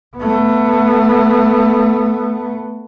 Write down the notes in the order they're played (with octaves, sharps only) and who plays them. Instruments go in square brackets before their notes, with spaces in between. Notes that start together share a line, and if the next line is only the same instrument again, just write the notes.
[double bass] A3 B3